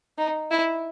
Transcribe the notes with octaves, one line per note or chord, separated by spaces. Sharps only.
D#4
E4